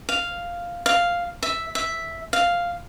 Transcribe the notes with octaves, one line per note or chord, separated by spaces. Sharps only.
F5
F5
E5
E5
F5